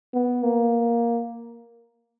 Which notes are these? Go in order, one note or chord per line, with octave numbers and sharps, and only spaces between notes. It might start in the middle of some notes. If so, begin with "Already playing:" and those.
B3
A#3